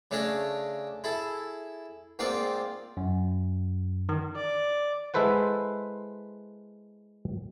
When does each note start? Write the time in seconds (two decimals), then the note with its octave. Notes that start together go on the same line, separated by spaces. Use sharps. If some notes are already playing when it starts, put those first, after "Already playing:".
0.11 C#3 A3 C#4 D4 G#4 D#5
1.04 E4 G#4 A4
2.19 G#2 A#3 C4 F4 D5 F5
2.97 F#2
4.09 D#3
4.36 D5
5.14 G#3 E4 A4 B4 C5 F#5